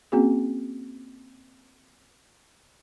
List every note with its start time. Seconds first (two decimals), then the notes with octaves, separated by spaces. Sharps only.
0.12 A#3 C4 C#4 F#4 G#4